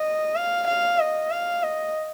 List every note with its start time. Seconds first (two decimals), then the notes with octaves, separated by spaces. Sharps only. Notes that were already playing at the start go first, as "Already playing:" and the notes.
Already playing: D#5
0.36 F5
0.68 F5
1.00 D#5
1.31 F5
1.63 D#5